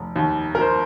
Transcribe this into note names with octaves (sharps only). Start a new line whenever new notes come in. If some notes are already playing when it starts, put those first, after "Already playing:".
Already playing: F1
D#2
A#4
C5